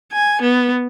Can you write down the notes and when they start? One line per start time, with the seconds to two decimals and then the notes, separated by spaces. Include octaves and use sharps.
0.12 G#5
0.42 B3